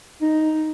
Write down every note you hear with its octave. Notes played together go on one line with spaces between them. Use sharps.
D#4